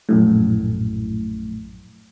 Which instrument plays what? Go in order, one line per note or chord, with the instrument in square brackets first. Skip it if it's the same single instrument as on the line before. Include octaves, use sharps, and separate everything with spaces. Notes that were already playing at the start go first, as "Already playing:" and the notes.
[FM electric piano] A#1 F#2 A2